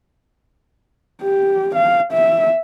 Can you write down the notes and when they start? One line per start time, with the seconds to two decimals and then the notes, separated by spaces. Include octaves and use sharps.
1.22 G4
1.75 F5
2.12 E5